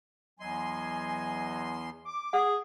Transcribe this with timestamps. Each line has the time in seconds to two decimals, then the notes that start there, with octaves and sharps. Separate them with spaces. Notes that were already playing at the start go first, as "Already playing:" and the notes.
0.40 E2 F#3 D#5 G#5 C6
2.06 D6
2.33 G#4 F#5